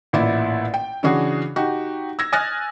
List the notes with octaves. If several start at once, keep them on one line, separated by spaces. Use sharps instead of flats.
A1 A#2 E4 D5 E5
G5
C#3 E3 C#4 D4 F#4 G#4
D#4 F#4 G4
E6 G#6 A#6
G#5 D#6 F6 F#6 A6 A#6